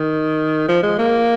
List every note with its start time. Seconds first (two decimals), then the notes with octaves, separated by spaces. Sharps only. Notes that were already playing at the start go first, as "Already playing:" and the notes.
Already playing: D#3
0.68 F3
0.83 G#3
0.99 A#3